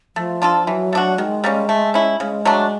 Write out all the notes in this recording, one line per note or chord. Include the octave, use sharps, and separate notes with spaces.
F3 A3
D4 F4 A4
E3 F#3
A3 D4 F#4
D#3 G#3
G3 A#3 C#4
A3
C#4 E4
C#3 G#3
F#3 A3 D4